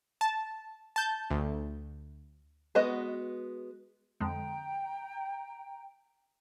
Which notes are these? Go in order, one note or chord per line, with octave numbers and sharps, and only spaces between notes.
A5
A5 G6
D2
G#3 B3 F#4 B4 D#5
F2 D3 G#3 G5 A#5